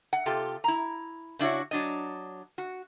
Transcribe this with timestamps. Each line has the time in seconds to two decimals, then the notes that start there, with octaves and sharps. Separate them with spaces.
0.13 F#5
0.26 C3 F4 G4 A4
0.64 E4 A#5
1.39 C#3 D4 E4 F#4 C#5
1.71 F#3 D4 D#5
2.58 F#4